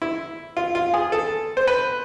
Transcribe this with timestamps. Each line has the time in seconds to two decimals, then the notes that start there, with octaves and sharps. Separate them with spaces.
0.02 E4
0.57 F4
0.75 F4
0.94 G#4
1.12 A4
1.57 C5
1.67 B4